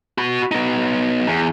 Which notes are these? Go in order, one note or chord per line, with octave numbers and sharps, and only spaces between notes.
F#4 B5
B3 D#4
E2